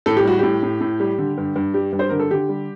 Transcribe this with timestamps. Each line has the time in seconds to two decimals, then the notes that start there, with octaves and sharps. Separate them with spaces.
0.06 A2 A4
0.17 G4
0.25 G3 F#4
0.39 A2 G4
0.63 A2
0.81 A2
1.00 G3
1.18 D3
1.38 G2
1.56 G2
1.74 G3 G4
1.93 G2
1.99 C5
2.09 D3 A#4
2.20 A4
2.31 D3 G4
2.49 G3